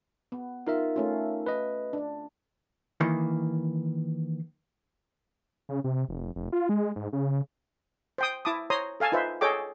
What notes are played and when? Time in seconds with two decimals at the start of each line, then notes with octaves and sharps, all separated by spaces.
0.32 B3
0.67 D#4 F4 A#4 E5
0.96 A3 C#4 F4
1.46 B4 D#5
1.93 D4
3.01 D#3 E3 A#3
5.69 C#3
5.84 C3
6.09 F1
6.36 F1
6.52 F4
6.69 G#3
6.96 G#2
7.13 C#3
8.18 C5 G5 D#6
8.45 E4 A5 D6 D#6
8.70 C5 C#5 A#5 C6 D#6
9.00 A4 F5 G#5 A5
9.12 D#4 F4 B4 C5 E5
9.41 G#4 A4 C#5 D#5 G5 D6